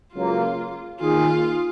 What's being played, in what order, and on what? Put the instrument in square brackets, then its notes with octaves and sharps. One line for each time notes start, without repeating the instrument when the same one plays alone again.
[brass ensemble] C#2 C#3 F#3 A#3 C#4 [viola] F4
[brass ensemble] D#3 A#3 D#4 G#4 [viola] F4